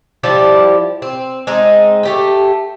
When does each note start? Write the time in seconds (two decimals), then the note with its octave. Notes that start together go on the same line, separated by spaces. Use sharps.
0.23 F3 G3 E4 G4
1.02 C4
1.47 G#3 C4 D#4
2.03 A3 G4 G5